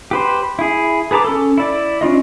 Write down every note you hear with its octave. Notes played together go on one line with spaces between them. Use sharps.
G4 B4 C5
E4 G#4
G#4 B4 A5 A#5 D6
C#4 A4
E4 D5
C#4 D4 F4 D#5